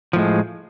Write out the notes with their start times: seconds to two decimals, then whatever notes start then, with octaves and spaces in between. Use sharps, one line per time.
0.13 F3
0.16 A2
0.19 G#3